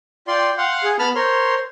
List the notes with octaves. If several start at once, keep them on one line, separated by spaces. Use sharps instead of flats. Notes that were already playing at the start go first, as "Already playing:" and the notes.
F4 D5 G5 C6
F5 F#5 C6
G#4
B3 A5 B5 F6
A#4 C5 C#5 C6